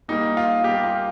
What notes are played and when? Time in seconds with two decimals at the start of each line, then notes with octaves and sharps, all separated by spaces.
0.08 A#2 G3 A#3 D#4
0.37 F4
0.64 A#2 G3 A#3 G4
0.84 F4